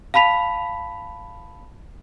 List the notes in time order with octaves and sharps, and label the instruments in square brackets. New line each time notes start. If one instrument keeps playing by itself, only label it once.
[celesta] F5 A5 B5 B6 F7